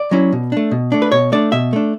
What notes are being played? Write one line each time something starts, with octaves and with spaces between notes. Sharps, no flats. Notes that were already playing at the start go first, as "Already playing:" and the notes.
Already playing: D5
F#3 C#4 E4
B2
A3 D4
B2
A3 D4
B4
B2 C#5
A3 D4 D5
B2 E5
A3 D4